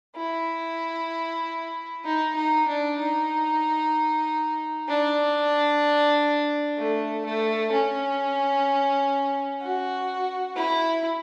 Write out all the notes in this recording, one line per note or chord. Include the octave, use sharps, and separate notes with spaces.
E4
D#4
D#4
D4
D#4
D4
A3
A3
C#4
F#4
E4